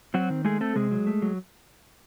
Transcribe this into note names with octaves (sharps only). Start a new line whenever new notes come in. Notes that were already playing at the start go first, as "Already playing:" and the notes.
F#3 C4 F#4
D#3
G#3 A3 G#4
A3 C4 A4
C3 G#3 G#4
F#3
A3
F#3